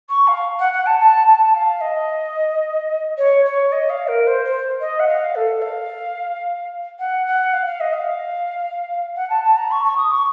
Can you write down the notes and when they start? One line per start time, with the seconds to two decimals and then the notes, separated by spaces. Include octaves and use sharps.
0.09 C#6
0.27 F5
0.59 F#5
0.73 F#5
0.86 A5
0.99 A5
1.27 A5
1.54 F5
1.81 D#5
3.17 C#5
3.45 C#5
3.72 D#5
3.89 F5
4.07 A#4
4.27 C5
4.45 C5
4.80 D#5
4.99 F#5
5.07 F5
5.35 A4
5.62 F5
6.98 F#5
7.26 F#5
7.53 F5
7.66 F5
7.80 D#5
7.93 F5
9.15 F#5
9.29 A5
9.44 A5
9.56 A#5
9.71 C#6
9.84 C#6
9.97 D#6
10.11 C#6